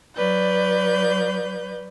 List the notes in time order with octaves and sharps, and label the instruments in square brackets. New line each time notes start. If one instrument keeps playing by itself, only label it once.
[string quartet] F#3 B4 D5 G6